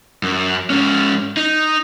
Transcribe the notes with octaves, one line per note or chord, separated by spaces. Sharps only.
F#2
G#2 C#4
D#4